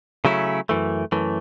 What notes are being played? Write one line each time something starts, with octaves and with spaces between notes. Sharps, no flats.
C#3 F#3 A3 C#4 E4
F#2 E3 A3
F#2 E3 A3